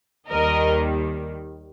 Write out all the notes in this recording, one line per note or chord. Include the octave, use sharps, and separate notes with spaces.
D#2 D#3 G3 A#4 D#5